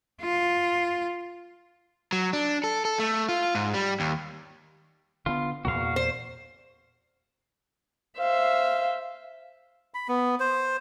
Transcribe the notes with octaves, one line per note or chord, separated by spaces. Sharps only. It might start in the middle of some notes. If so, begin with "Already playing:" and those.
F4
F#3
D4
A4
A4
A3
F4
G#2
G3
D#2
D3 B3 F4
E2 A#2 A#3 F#4 F5
C5
C5 E5 F5
B5
B3
C5